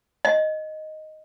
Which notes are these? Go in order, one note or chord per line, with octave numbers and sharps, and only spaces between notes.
D#5